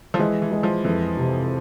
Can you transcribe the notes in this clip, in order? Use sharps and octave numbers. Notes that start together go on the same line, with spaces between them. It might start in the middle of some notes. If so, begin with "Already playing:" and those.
F3
E3 G#3
E3
G#3
F3
F2 E3
C3